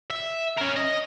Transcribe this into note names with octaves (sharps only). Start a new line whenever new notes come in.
E5
C#4 A#4
D#5